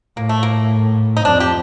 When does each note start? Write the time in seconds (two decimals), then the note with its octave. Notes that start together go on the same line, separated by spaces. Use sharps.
0.17 A2 A#3
0.29 A3
0.43 A#3
1.17 D#4
1.25 F2 D4
1.40 G4